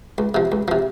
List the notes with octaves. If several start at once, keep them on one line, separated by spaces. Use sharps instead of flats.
C#2
C3 F3
C#2
C3 F3